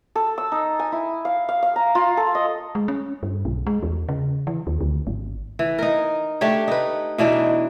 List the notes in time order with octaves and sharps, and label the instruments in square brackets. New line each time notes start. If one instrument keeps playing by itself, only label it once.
[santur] A4
E6
D#4
G#5
E4
F5
F5
F5
A#5
F4
A4
D#5
[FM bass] G#3
C#4
G2
B1
G#3
E2
C#3
E3
D#2
D2
G#1
[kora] E3
D#4 A#4
A3 D4 G4 C#5
D#4 B4
B2 E3 D4 D#4